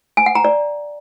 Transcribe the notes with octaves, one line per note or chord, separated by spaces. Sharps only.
G#5
F#5
A#5
D5